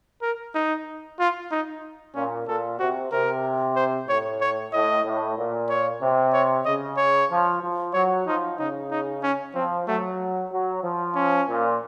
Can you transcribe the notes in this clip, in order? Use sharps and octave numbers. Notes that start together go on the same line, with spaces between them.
A#4
D#4
F4
D#4
A#2 C#4
A#2 A4
C3 F#4
C3 A#4
C5
A2 C#5
C#5
A2 D#5
A2
A#2
C#5
C3
C#5
C#3 D#5
C#5
F3
F3
F#3 C#5
F3 D#4
C#3 D#4
D#4
C#4
F3 C4
F#3 A3
F#3
F3
C#4
A#2